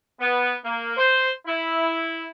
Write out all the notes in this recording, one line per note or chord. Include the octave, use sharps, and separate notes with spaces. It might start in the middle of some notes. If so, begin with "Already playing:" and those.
B3
A#3
C5
E4